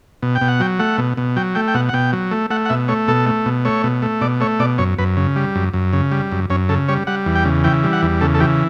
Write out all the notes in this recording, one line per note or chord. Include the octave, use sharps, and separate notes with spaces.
B2
G5
B2
F#5
F#3 G5
A3 F#5
B2
B2
F#3 G5
A3 G5
G5
B2 F#5
F#5
B2 G5
F#3
A3
A3 F#5
F#5
B2 E5
A3 C#5
B2 A4
A3
B2
A3 C#5
B2
A3
B2 D5
A3 C#5
B2 D5
F#2 C#5
F#2 B4
C#3
G3
F#2
F#2
C#3
G3
F#2
F#2 C#4
C#3 A4
G3 C#5
G3 F#5
E2
G5
C#3
E3 G5
G3
F#5
E2
C#3 A4
A4
E3 G4